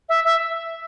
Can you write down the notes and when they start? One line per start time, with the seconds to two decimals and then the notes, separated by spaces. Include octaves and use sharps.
0.09 E5
0.24 E5